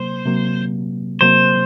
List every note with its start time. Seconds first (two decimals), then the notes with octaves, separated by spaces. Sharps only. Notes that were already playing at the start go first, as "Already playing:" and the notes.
Already playing: C3 F#3 A#3 C5
0.26 C3 F#3 A#3
1.21 C3 F#3 A#3 C5